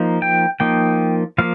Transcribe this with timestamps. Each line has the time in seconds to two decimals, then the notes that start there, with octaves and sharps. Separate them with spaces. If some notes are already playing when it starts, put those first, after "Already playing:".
Already playing: F3 A#3 D#4
0.22 G5
0.60 F3 A#3 D#4 G5
1.38 F3 A#3 F5